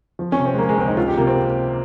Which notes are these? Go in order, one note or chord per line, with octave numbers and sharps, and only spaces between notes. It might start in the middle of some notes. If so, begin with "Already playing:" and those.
F3
C#4
C3
C4
G#3
F3 A#3
G#3
C#2 C4
D#4
C#2 F4
G4
C3 A#3
C4